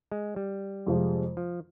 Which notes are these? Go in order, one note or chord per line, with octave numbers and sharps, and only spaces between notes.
G#3
G3
F2 C3 F3 G#3
F3